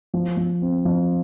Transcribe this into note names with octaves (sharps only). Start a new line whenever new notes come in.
F3
F3
C4
F3